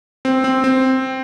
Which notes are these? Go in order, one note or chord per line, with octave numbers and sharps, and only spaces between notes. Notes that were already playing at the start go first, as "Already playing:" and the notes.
C4
C4
C4